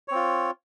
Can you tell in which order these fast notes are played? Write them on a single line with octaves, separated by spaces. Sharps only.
C#5 C4 F4